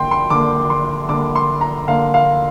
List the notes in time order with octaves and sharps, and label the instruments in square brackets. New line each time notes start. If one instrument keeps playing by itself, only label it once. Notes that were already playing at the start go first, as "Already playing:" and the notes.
Already playing: [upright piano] D3 A#3 G5 C6
C6
D3 A#3 D6
C6
D3 A#3 D6
C6
A#5
D3 A#3 F5
F5